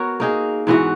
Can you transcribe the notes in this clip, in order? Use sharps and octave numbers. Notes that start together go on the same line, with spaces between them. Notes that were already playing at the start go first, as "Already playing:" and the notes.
Already playing: B3 F#4 A#4 C#5
A#3 D#4 G#4
G#2 E3 B3 F#4